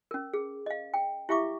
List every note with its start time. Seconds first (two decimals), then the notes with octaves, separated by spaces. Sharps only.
0.11 C#4 A#4
0.34 G#4
0.66 D#5 F5
0.94 G5
1.29 E4 G4 E5 F5 C#6 D6